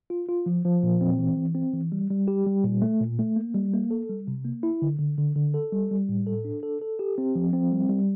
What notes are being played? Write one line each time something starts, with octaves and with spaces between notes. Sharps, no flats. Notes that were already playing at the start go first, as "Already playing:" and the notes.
F4
F4
F3
F3
A#2
C4
E3
E3
C4
E3
G3
G3
G4
G3
A#2
A3
A#2
A3
A#3
G3
A#3
A4
G3
C3
A#3
E4
D3
D3
D3
D3
A4
G3
G3
A2
A4
D4
A4
A4
G4
C4
F3
C4
G3
G3